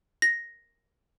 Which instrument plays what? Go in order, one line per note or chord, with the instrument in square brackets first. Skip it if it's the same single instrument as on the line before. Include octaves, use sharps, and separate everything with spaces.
[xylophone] A#6